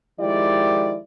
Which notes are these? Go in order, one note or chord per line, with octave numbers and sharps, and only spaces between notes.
D#3 F3 G#3 E4 G4 D5